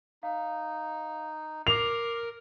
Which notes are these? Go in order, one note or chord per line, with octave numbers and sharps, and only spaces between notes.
D#4 F5
A#4 D6 C7 F7